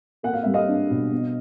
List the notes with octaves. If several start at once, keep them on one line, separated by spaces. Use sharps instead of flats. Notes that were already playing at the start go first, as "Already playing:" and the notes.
A#3 F#5
F5
G3 E5
D#5 F5
D4
B2
B3